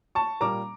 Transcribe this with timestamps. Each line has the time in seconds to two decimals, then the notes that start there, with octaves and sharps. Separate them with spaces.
0.15 A5 C#6
0.40 A#2 G3 A#3 A#5 D6